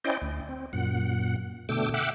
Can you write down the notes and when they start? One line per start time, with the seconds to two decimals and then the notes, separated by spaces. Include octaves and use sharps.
0.04 C#4 E4 C5 D5 D#5 G5
0.22 D2
0.49 C4
0.73 F#2 A#2 F#5
1.69 B2 D3 A3 G5 D6 E6
1.94 E5 F#5 G5 D6 E6 F#6